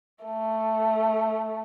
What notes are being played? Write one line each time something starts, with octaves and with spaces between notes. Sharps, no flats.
A3